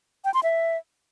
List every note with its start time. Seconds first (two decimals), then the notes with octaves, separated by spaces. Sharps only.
0.25 G5
0.34 C6
0.43 E5